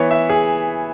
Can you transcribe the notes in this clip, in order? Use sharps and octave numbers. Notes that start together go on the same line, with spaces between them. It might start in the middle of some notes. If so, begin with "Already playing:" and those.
Already playing: E3 B3 C#5
E5
G#4